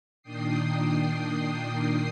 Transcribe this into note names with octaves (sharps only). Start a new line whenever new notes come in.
A#2 D#3 D4 G5 D#6 C7